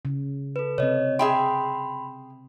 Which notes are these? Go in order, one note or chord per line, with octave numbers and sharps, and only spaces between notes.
C#3
A4 B4
C3 C4 C#5 D#5
G#4 E5 G5 B5 C6